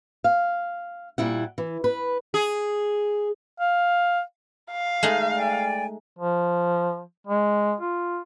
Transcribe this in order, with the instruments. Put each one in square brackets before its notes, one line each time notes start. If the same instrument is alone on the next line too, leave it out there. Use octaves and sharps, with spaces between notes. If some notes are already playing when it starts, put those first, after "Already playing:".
[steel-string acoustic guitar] F5
A#2 G3 E4 F#5
E3
B4
[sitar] G#4
[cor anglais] F5
[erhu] F5
[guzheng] G#3 A3 D#4
[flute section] D5 G5 G#5
[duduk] F3
G#3
F4